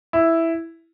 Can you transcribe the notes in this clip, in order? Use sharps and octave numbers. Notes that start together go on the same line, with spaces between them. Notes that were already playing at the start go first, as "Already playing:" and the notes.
E4